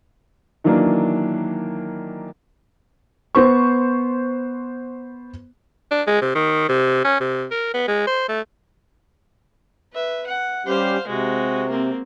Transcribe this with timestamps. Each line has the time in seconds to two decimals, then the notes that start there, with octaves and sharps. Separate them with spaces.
0.64 D#3 E3 F#3 A#3 D4
3.35 B3 C5 C#6
5.91 D4
6.07 G#3
6.21 C3
6.35 D#3
6.69 C3
7.04 C#4
7.20 C3
7.51 A#4
7.74 B3
7.88 G#3
8.07 C5
8.28 A3
9.93 B4 E5
10.27 F#5
10.66 G3 C#4 G4 C5 F5
11.07 C3 G#3 F#4
11.69 A#3 C4